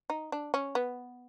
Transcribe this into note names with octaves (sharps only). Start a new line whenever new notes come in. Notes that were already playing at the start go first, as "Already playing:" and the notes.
D#4
D4
C#4
B3